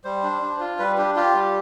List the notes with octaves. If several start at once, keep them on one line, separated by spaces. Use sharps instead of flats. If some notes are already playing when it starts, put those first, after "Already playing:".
G3 C5
D4
D4
F4
G3 B4
D4 G4
F4 G4
G3